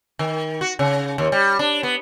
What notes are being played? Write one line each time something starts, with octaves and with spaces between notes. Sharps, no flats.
D#3
F#4
C#3
D#2
G3
D4
B3